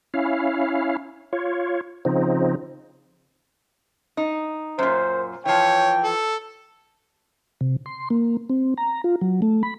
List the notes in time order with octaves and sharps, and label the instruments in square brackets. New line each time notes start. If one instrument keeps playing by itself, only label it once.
[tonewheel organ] C#4 E4 F5
F4 C#5
C#3 F3 C4 D#4
[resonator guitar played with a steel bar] D#4
[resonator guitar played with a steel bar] F#2 A#2 [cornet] C5
[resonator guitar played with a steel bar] E3 F3 [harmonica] C#5 [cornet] G5
[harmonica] A4
[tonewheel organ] C3
C6
A#3
C4
A#5
F4
F#3
A3
B5